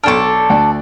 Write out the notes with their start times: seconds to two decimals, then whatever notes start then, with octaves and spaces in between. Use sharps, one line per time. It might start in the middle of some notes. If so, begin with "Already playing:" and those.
0.04 B1 D4 A4 C#6 F6
0.50 D2 D5